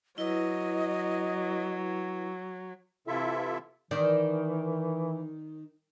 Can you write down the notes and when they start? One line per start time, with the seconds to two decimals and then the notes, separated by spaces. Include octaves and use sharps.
0.18 F#3 E4 B4 D#5
3.07 C3 E3 E4 F4 A4 E5
3.91 D#3 E3 C5 D5